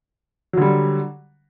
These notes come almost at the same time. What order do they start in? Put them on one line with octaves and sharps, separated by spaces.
F#3 D3 G3